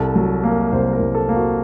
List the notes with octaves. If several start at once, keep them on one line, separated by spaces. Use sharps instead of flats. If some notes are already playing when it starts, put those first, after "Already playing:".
Already playing: C2 A4
F#3
A#3
C2 C5
A#4
C2
A4
A#3
F#4